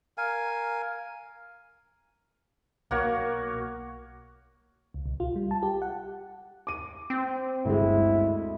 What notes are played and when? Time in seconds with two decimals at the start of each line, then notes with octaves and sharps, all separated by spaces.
0.18 A#4 F5 G#5
2.91 B1 A#3 F#4 C#5
4.94 C#2
5.06 B1
5.20 F4
5.36 G3
5.51 A5
5.63 G4
5.82 F#5
6.67 D6 D#7
7.10 C4
7.65 G1 D2 G#3 E4